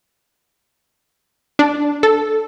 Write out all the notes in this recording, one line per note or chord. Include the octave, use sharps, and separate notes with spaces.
D4
A4